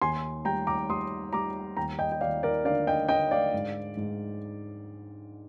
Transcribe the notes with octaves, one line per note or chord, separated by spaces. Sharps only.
D#2 G#5 C6
G3 G5 A#5
A#5 D6
G3 C6 D#6
G3 A#5 D6
D#2 G5 A#5
D#5 G5
G5
D#2 D5 F5
A#4 D5
D3 D5 F5
D#5 G5
D3 D#5 G5
D5 F5
G#2
G#2